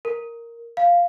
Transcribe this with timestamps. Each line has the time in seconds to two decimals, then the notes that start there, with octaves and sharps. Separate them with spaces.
0.05 A#4
0.77 F5